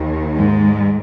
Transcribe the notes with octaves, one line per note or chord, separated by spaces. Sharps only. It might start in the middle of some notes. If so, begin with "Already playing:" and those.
Already playing: D#2 D#3
G#2 G#3